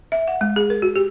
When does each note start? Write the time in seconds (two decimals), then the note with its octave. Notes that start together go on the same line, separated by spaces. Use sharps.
0.12 E5
0.28 F#5
0.41 G#3
0.56 G#4
0.70 A#4
0.82 F#4
0.96 G4